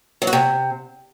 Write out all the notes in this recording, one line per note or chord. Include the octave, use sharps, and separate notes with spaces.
F#3
F#4
C3